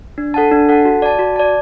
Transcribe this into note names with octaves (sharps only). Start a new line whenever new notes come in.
D4
A4 F#5 A5
D4
A4 F#5 A5
F#4
D5 A5
F#4
D5 A5